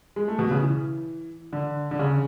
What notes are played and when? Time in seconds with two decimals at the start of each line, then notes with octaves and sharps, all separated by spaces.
0.16 G#3
0.28 A3
0.39 B2
0.51 C#3
0.62 E3
1.53 D3
1.91 D3
1.99 C#3